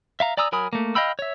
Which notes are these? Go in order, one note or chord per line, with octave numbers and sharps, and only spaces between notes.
E5 F5 A#5
D5 G#5 A#5 D#6 E6
F#3 A#4 G#5 B5 D#6
A3 A#3
D#5 F5 G5 B5 E6
C#5 E5